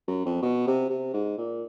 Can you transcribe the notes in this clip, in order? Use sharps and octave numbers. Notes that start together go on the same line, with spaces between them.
F#2
F2
B2
C3
C3
G#2
A#2